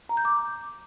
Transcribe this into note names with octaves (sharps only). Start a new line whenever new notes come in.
A#5
G6
D6